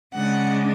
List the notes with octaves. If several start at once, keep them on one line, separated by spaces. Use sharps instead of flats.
C#3 G#3 D4 F#5